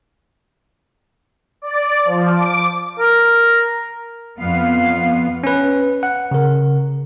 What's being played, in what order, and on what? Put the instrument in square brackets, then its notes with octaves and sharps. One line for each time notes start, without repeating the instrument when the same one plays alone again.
[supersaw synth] D5
F3
D6
[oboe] A#4
[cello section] F2 B3 F5
[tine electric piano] C#4 B4
F#5
C#3 A#4